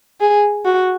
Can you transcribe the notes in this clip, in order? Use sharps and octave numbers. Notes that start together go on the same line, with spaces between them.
G#4
F#4